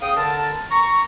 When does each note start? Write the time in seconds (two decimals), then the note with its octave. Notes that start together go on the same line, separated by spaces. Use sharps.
0.02 C#3 F5 G5 D#6
0.17 D3 A#4 A5
0.71 A#5 C#6